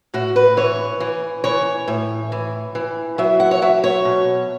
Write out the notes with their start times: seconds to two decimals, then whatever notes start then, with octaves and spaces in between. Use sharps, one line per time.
0.14 A2 F#4
0.36 B4
0.57 E3 C#5
1.00 E3
1.44 E3 C#5
1.88 A2
2.32 E3
2.75 E3
3.18 F#3 E5
3.40 F#5
3.51 C#5
3.62 F#3 E5
3.84 C#5
4.05 B2